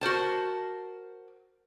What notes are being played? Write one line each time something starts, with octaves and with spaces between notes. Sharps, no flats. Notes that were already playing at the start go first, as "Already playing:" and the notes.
F#4 A#4 C5 A5